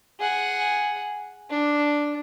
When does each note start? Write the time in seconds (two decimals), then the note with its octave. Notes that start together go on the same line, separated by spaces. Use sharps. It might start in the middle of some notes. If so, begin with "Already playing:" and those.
0.20 G#4 F#5
1.50 D4